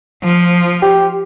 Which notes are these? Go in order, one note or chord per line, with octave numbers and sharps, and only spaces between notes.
F3
G4